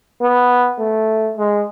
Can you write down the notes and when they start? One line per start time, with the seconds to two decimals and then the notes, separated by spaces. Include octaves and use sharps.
0.21 B3
0.79 A3
1.37 G#3